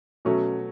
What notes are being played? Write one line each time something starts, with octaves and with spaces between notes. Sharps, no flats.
B2 F#3 A3 C#4